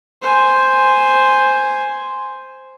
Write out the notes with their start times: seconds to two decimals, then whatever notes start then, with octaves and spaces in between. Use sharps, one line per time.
0.22 C5 G#5